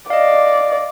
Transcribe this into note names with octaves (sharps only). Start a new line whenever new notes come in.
D5 D#5 F5